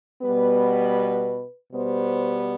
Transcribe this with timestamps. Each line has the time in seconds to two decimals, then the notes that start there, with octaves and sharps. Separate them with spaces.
0.22 B2 G3 B3 B4
1.72 B2 G3 B3 C5